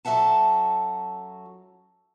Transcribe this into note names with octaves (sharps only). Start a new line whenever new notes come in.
F#2 F#3 A4 E5 F#5 A5